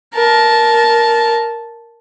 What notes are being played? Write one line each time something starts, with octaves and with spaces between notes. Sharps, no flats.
A#4 A5